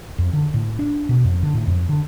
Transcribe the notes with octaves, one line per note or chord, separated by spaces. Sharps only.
F2
D3
A2
D4
B2
F2
D3
A2
F2
D3